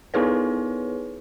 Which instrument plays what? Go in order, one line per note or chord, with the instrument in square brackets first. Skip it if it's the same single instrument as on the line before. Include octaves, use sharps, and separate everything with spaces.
[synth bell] B3 D#4 E4 G#4 B4 C#5